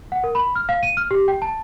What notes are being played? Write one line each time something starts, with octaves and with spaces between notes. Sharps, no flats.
F#5
A#4
B5
F6
F5
D#7
F6
G4
G5
A5